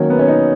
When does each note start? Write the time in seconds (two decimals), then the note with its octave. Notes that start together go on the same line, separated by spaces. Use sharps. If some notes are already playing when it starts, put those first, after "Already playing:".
Already playing: D#3 F#3 A#3 C#4
0.10 B3
0.19 C#4
0.28 D#4